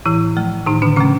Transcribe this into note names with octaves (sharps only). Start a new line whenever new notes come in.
A2 E3 E4
F3 A3
A2 D#3 D#4
D3 D4
C#3 F3 A3 C#4